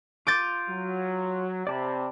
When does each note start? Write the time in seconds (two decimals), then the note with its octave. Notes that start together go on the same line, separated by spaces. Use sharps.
0.27 F4 D6 G6 A6
0.70 F#3
1.67 C3 D5 A5 B5